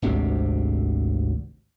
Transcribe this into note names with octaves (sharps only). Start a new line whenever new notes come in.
G#1 D2 C3